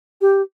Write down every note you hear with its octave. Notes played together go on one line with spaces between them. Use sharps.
G4